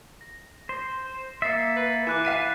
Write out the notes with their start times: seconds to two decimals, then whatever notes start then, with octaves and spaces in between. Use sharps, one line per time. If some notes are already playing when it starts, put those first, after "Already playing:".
0.21 A#6
0.69 C5
1.42 A#3 E5 A6 C7 C#7
1.76 B4
2.07 E3 E4 G#5 D6 F#6 E7
2.25 F5 B6 D#7